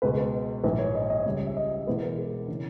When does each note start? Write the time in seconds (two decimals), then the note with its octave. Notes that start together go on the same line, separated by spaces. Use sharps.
0.02 C#2 B2 G#3 B4
0.17 B4
0.64 A#1 G#2 D#3 B4
0.79 C#5
0.95 D#5
1.10 D#5
1.25 C#2 C#3 G3
1.47 E5
1.57 D#5
1.71 D#5
1.87 E1 E2 B2 G#3 B4
2.03 A#4
2.18 G#4
2.48 C#3 E3